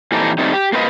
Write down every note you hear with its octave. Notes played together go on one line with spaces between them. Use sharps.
A#2 E3 C4 D#4 G4 A4
D#3 F#3 G3 A3 C4 D#4
G4
A#3 C4 F4 B4 D#5